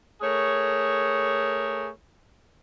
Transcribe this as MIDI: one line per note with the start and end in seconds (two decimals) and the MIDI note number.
0.22 1.89 57
0.22 1.89 68
0.22 1.89 70
0.22 1.89 73